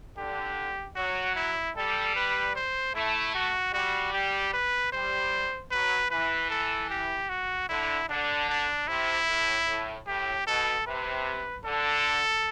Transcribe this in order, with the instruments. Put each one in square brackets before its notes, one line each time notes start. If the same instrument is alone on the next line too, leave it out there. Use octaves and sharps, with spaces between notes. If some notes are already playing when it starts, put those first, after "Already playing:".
[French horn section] D3 [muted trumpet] G4
[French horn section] F#3 [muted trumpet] F#4
[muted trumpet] E4
[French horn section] G3 [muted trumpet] A4
[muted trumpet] B4
C5
[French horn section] A3 [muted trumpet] E4
[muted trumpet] F#4
[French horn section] G3 [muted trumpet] F#4
[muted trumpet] G4
B4
[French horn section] G3 [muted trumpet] C5
[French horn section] F#3 [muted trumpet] B4
[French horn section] E3 [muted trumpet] B4
[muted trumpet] A4
G4
F#4
[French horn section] D3 [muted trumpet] E4
[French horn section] D3 [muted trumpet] D4
[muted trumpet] D4
[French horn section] C3 [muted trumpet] E4
[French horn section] A2
A2
[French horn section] A2 [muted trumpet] G4
[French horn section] B2 [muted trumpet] A4
[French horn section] C3 [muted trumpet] B4
[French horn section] D3 [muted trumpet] A4